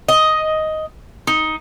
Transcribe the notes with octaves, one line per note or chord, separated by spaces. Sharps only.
D#5
D#4